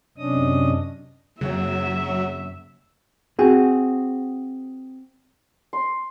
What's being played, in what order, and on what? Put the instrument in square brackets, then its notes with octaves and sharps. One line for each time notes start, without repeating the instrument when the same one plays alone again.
[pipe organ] F#2 C3 C#4 D4 D#5 D#6
[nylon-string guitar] F#2 A#3 C4 [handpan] C#3 [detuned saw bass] F#3 [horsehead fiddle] E5
[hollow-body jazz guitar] C4 F#4 G#4
[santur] C6